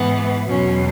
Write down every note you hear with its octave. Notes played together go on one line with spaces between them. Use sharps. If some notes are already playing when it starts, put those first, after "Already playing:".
Already playing: G#2 E3 B3
E2 B2 F#3 C#4